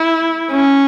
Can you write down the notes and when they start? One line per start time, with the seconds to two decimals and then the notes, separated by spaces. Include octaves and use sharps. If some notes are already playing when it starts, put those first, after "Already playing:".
Already playing: E4
0.52 C#4